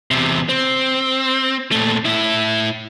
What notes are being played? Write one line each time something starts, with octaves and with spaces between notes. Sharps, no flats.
E2 C3
C4
A#2 A3
A2 E4